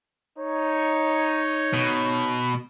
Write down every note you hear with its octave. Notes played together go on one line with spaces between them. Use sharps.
D#4 C#5
B2